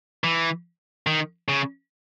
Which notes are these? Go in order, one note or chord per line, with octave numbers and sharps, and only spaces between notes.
E3
D#3
C#3